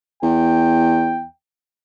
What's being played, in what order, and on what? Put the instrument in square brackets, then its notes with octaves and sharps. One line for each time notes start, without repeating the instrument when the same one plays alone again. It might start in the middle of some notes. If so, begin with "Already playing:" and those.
[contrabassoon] E2 [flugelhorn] G5